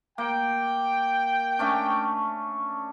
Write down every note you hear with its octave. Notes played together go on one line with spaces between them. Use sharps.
A#3 G5
A3 C#4 D4